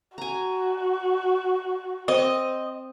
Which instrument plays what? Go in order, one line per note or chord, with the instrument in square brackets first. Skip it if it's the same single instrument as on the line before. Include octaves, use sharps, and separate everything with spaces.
[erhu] F#4 [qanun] G#5 A#5
[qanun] C4 [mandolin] D#5